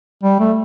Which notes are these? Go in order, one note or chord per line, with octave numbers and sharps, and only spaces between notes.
G3
A3